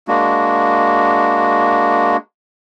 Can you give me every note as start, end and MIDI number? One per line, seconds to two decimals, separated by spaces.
0.08 2.17 56
0.08 2.17 58
0.08 2.17 62
0.08 2.17 66